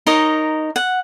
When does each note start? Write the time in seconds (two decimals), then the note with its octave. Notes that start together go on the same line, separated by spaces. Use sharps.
0.07 D#4 A#4 C#5 D#5
0.76 F#5